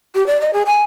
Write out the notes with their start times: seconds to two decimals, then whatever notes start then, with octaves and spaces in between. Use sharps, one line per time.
0.15 G4
0.27 D5
0.41 D#5
0.53 G#4
0.66 G#5